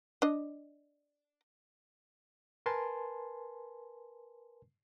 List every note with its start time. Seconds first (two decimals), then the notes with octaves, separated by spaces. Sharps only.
0.22 D4 D#5
2.66 A#4 B4 G#5 A5 C6